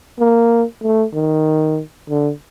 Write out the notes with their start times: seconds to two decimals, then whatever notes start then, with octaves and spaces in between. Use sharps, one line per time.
0.20 A#3
0.83 A3
1.14 D#3
2.09 D3